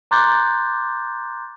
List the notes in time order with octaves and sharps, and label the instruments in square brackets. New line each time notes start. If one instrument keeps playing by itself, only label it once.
[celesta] A#5 C6 D6 F#6 G6 A6